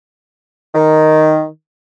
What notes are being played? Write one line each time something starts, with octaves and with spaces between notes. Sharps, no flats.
D#3